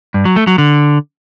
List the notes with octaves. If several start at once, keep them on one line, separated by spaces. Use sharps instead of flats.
G2
F#3
A3
F#3
D3